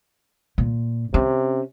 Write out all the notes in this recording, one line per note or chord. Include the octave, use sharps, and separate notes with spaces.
A#2
C3 C#4